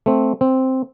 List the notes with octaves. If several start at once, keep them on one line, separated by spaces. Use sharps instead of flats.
A3 C4
C4